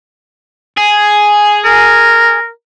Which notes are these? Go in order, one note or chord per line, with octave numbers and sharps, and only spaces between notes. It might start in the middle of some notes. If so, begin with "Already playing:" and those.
G#4
A#4